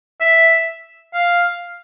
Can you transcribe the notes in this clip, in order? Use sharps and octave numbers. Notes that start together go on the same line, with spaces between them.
E5
F5